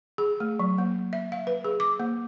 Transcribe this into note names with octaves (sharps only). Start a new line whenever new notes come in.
G#4
A3
F#3
A#3
E5
F5
B4
G#4
D6
A#3